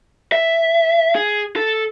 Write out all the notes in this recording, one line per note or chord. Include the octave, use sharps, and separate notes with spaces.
E5
G#4
A4